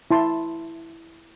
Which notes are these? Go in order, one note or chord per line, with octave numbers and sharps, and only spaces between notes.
E4 A5 C6